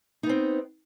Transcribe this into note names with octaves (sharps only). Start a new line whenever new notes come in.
B3 C4 D#4